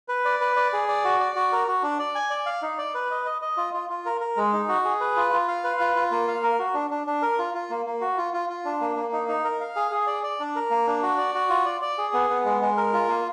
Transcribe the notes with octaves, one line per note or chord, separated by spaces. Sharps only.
B4
D5
B4
D5
G#4
D5
F#4
D5
F#4
A#4
F#4
D4
D5
G#5
D5
F5
D#4
D5
B4
D#5
D#5
D#5
F4
F4
F4
A#4
A#4
G#3
D#4
F#4
G#4
B4
F4
F4
F5
B4
F4
F4
A#3
F5
A#4
F#4
D4
D4
D4
A#4
F4
F4
A#3
A#3
F#4
F4
F4
F4
D4
A#3
A#3
D#4
D#4
A#4
F5
G#4
G#4
D5
D5
D4
A#4
A#3
D4
F#4
D5
F#4
F4
D5
D5
G#4
B3
B3
G#3
G#3
A#4
F4
A#3